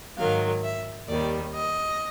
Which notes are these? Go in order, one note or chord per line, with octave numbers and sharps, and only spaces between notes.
G#2 D#3 F#3 F5
E5
D#2 D#3 G3 D5
D#5